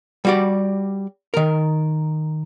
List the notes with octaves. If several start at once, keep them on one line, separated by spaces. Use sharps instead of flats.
G3 F#4 D5
D#3 A#4